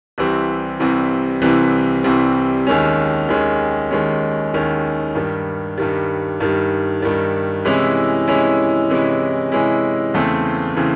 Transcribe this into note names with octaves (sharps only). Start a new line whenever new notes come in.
C2 C3 E3 G3 C4
C2 C3 E3 G3 C4
C2 C3 E3 G3 C4
C2 C3 E3 G3 C4
D#2 D#3 G#3 C#4
D#2 D#3 G#3 C#4
D#2 D#3 G#3 C#4
D#2 D#3 G#3 C#4
G2 D#3 G3
G2 D#3 G3
G2 D#3 G3
G2 D#3 G3
C3 E3 G#3 C#4 E4
C3 E3 G#3 C#4 E4
C3 E3 G#3 C#4 E4
C3 E3 G#3 C#4 E4
E2 C#3 E3 A3 C4
C#3 E3 A3 C4